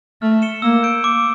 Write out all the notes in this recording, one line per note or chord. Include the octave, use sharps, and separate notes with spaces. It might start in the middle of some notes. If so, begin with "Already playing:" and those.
A3 F6
C#7 E7 G7
A#3 E6
G6 D7
D6